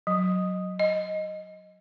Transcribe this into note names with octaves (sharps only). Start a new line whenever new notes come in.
F#3
D#5